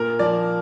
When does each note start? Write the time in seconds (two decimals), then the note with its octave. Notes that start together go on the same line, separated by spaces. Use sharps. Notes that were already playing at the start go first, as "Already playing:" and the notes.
Already playing: A#2 A#4
0.19 F3 A#3 D5